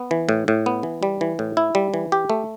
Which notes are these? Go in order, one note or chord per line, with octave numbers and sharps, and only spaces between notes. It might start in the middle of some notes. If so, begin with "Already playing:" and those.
Already playing: B3
E3
A2
A2
B3
E3
G3
E3
A2
E4
G3
E3
G4
A3